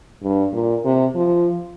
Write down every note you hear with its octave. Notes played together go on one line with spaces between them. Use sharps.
G2
A#2
C3
F3